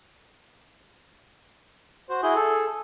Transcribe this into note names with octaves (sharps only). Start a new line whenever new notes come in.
F#4 C5
E4 F#4 G#4 G6
A4